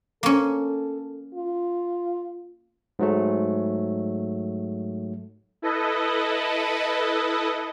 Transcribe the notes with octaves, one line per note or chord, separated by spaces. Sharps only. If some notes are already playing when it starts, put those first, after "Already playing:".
A#3 C#4 A4
F4
G#2 F#3 A3
E4 A4 B4 D#5